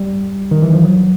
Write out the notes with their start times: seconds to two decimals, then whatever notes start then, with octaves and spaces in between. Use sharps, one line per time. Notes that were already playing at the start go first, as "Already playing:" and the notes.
Already playing: G3
0.51 D#3
0.62 E3
0.74 F3
0.84 F#3